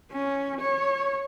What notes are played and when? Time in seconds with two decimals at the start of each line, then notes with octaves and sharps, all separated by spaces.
0.12 C#4
0.60 C#5